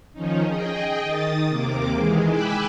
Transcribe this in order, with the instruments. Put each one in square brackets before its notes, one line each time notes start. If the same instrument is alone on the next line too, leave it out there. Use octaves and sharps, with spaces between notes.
[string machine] D#3 F3 C#4 D#4
G#4 D#5 G5
D#3 D#6 A6
D#2 C3 A#3 D6
D#3 E3 G#3 G#4
G5 G#5 B5 D6 E6 F#6